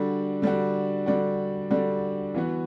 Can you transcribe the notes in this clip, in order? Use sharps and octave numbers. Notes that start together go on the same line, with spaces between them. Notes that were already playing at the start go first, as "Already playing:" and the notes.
Already playing: D3 G3 D4 F#4
D3 G3 D4 F#4
D3 G3 D4 F#4
D3 G3 D4 F#4
E3 B3 F#4